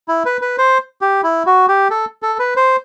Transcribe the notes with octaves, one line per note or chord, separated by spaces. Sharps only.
E4
B4
B4
C5
G4
E4
F#4
G4
A4
A4
B4
C5